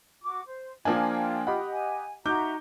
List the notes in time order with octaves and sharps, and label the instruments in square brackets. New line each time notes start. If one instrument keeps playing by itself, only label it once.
[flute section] F#4 D6
C5
[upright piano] F3 A#3 D4 [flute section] F4 G5 [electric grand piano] G#5
[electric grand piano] G4 D#5 F#5 [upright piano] B5
[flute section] G#5
[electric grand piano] D#4 [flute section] F#4 E5 A#5 [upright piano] D6 G6